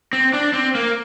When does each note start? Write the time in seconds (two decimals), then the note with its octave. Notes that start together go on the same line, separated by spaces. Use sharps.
0.13 C4
0.33 D4
0.53 C4
0.75 A#3